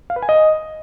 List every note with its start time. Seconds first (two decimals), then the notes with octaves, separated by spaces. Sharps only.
0.10 F5
0.16 B4
0.22 G#5
0.29 D#5